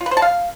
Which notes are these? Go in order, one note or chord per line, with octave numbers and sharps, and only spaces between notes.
F4
B4
C5
A5
F5